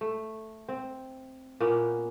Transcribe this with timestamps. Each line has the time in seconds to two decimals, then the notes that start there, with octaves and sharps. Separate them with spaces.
0.01 A3
0.68 C4
1.60 A#2 A#3 B3 C#4